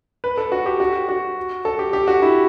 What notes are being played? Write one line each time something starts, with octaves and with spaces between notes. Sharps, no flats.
B4
A4
F#4
G4
F#4
F#4
A4
G4
G4
F#4
E4